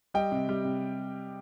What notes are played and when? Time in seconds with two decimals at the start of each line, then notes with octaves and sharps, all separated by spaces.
0.14 G3 D#5 G5
0.32 C3
0.49 G3
0.65 C3